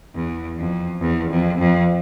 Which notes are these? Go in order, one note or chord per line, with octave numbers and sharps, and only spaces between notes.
E2
F2
E2
F2
F2